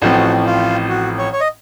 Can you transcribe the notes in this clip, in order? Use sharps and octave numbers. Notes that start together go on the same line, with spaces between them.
A1 A2 F3 C4 F#4
F4
F#4
C#5
C#5
D#5